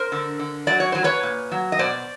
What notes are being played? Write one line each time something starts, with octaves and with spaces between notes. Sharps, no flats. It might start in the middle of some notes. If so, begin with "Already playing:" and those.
Already playing: A#4 C5
D3
D3
F#3 D5
C#5
F#3 C5
B4 C#5
A#2
F#3
D#5
B2 C5 D5